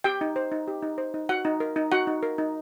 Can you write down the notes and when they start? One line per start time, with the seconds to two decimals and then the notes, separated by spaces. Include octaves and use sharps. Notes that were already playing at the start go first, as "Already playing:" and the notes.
0.04 G4 G5
0.21 D#4
0.36 C5
0.52 D#4
0.68 G4
0.82 D#4
0.98 C5
1.14 D#4
1.29 F#4 F#5
1.45 D#4
1.60 A#4
1.76 D#4
1.92 F#4 F#5
2.07 D#4
2.23 A#4
2.38 D#4